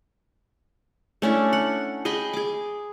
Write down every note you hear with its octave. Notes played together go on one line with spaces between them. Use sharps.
A3 C#4 D4 E4
F#5
G#4 D#5 G5 B5
G#4 D6